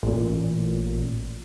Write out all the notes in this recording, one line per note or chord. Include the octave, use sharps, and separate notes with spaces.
A1 A#2